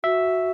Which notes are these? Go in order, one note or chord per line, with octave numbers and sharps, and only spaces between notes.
F#4 E5